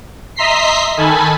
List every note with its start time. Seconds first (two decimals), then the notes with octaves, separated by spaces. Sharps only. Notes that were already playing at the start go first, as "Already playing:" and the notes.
0.36 D#5 E5 A#5 C6 B6 C7
0.97 D#3 A4 G#5 A5 B5